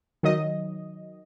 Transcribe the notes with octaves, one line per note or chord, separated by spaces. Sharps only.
D#3 F#3 D#5